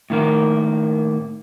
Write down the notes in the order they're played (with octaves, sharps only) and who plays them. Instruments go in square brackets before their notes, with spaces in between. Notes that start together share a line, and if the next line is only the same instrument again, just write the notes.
[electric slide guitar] A2 D#3 A#3